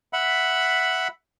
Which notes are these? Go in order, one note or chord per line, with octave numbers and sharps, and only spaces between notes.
E5 F#5 B5